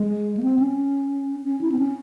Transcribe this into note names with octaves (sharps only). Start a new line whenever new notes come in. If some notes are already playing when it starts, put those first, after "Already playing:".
Already playing: G#3
A#3
C4
C#4
C#4
E4
C4
C#4